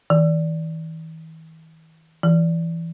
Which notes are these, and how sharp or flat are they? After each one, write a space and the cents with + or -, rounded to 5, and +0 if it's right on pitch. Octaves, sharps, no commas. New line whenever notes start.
E3 -45
E3 +10